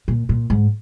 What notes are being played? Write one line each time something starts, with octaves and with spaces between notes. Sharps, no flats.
A#2
A#2
G#2